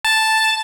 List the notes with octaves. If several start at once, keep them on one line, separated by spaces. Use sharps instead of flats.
A5